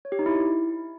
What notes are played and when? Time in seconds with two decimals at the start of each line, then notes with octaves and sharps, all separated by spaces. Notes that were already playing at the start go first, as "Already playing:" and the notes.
0.05 C#5
0.12 G4
0.19 D#4
0.26 E4